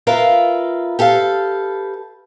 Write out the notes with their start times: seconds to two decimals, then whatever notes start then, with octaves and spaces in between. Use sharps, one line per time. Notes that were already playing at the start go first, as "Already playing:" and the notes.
0.07 F4 A#4 B4 E5 F5
0.99 G4 A4 B4 F5